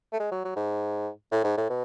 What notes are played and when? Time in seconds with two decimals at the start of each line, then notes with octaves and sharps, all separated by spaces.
0.12 A3
0.19 G#3
0.31 F#3
0.44 F#3
0.56 G#2
1.31 A2
1.44 G#2
1.57 A2
1.69 B2